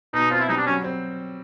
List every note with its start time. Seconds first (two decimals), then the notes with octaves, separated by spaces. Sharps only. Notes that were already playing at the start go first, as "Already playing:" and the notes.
0.14 B2 D#4
0.30 C4 F4
0.40 E4
0.48 G3 D#4
0.58 D4
0.66 F#3 C#4
0.84 C4